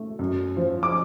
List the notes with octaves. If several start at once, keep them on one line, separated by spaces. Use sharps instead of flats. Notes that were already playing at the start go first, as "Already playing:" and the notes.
Already playing: A3
F#2
F3
D6